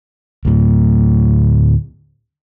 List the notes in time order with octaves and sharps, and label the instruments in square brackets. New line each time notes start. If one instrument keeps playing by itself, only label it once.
[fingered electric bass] D2 A2